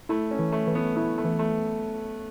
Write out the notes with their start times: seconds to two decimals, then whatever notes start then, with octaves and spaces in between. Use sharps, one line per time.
0.09 A3 E4
0.31 C#4
0.39 E3
0.52 A3
0.67 E3
0.75 B3
0.96 B3 E4
1.18 A3
1.25 E3
1.39 A3